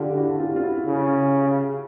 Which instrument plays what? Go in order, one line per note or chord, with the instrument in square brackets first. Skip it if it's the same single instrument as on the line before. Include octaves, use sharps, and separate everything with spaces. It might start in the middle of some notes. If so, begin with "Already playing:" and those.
Already playing: [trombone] D3 [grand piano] F4 G4
[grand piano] G4
E4 F#4
F4 G4
F4
E4 F#4
[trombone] C#3